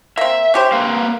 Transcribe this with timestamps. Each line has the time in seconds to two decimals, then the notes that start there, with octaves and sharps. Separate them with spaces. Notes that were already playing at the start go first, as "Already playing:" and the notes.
0.18 A#3 C4 E5
0.54 C#4 G4 C5
0.72 A#3 B4 F5